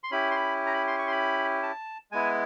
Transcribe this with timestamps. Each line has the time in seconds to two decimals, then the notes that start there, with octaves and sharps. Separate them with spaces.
0.04 C6
0.11 C#4 E4 G4 B5
0.31 C6
0.36 B5
0.66 A#5
0.74 B5
0.87 C6
0.99 C#6
1.07 C6
1.12 B5
1.63 A5
2.12 G#3 B3 E4 G#5